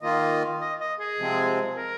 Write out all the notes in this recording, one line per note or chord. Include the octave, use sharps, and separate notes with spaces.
D#3 A#3 F4 D#5
D#5
D#5
G#4
C3 F3 G#3 C4
A#4